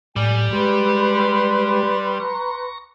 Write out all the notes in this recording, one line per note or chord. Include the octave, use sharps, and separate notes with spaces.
A2 G3 D5 G#5
G#3 G4 B4 B5 C6
A#5 C#6